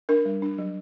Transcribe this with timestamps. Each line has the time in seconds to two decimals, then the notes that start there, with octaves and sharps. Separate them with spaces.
0.09 D4 A#4
0.25 G3
0.42 D4
0.58 F#3